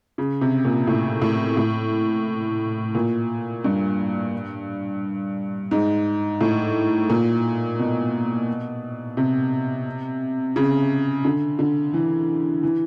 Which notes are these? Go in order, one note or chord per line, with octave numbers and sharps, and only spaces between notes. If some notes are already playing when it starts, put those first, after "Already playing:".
C#3
C3
A#2
A2
A2
A2
A#2
G2
G#2
A2
A#2
B2
C3
C#3
D3
D3
E3
E3